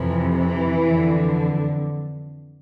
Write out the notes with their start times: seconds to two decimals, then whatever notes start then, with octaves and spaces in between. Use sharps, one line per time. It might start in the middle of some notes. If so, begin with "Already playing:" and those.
Already playing: F2 C3 E3 F3
0.36 E3
0.87 F2 D3